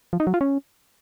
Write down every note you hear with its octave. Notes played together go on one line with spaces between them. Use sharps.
F3
D#4
F#3
F4
C#4